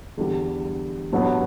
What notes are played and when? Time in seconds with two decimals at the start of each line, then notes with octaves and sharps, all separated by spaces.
0.17 E2 D3 G3
1.13 A1 G2 F#3 B3